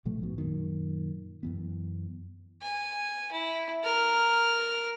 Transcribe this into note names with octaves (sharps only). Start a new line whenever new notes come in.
A1 B2 F3 A3
A#1 G#2 B2
F#2 A#2 D#3
F#2 E3 B3
G#5
E4
A#4 F6